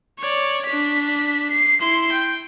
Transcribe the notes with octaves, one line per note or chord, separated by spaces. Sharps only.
C#5 D5
D4 B6
C7
E4 C6
G5